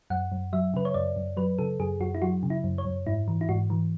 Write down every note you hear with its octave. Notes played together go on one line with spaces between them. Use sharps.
F#2 F#5
F#2
F#3 E5
C#3 B4
C#5
F#2 D5
F#2
F#3 B4
C#3 A4
F#2 G#4
F#2 F#4
E4
F#3 F#4
C#3
E4
F#2
C#5
F#2
G#2 E4
E3
E4
G#2 F#4
E3